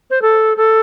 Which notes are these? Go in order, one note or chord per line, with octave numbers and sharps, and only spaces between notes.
C5
A4
A4